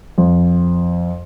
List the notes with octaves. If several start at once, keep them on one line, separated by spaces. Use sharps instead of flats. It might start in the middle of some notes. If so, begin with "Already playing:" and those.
F2